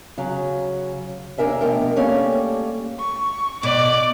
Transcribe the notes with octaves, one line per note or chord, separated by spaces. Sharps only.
C#3 F#3
D#2 G#2 D4 A#4 E5 G#5
F2 B2 A3 A#4 G5
G3 A3 A#3 C#4 G4 A4
C#6
B2 D5 D6